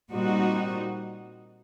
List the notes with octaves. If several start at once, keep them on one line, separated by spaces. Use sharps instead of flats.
A#2 G3 C4 D#4 F#4